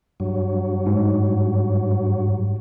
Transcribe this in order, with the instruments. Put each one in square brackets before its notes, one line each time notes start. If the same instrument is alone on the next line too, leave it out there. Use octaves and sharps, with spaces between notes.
[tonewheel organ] G2 F#3
[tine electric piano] G#2